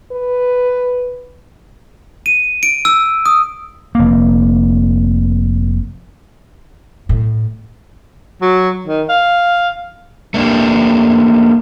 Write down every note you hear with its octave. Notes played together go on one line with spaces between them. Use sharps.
B4
D#7
D7
E6
D#6
F1 A#3
A2
F#3
D#3
F5
A3 A#3 D4 G4